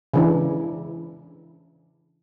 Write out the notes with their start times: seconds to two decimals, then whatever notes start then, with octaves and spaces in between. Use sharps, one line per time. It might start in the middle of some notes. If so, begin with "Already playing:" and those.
0.14 C#3 E3 D4